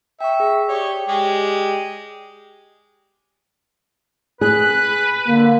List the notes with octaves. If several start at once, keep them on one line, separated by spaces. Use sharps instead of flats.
E5 G5 C#6
G#4
G4 C#5 D5 G5 D#6
G#3 G4 G#4
G#4 B4 F#6
D3 A#3